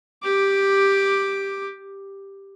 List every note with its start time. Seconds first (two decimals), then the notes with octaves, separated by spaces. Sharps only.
0.23 G4 D6